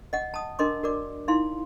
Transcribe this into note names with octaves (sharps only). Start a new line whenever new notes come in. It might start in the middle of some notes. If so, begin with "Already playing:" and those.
D#5 F#5
A5 D#6
D4 A#4 D#5 C6 D6
F#4 A#4 D5 D6
D#4 E4 F5 C6